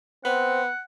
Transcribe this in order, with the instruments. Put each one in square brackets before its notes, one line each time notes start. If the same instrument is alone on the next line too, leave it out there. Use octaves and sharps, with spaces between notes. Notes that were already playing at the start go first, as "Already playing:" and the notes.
[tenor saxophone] B3 [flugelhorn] C4 [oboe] F#5